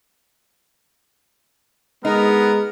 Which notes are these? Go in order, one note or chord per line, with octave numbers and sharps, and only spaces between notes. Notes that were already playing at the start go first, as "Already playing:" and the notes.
G#3 B3 D#4 A#4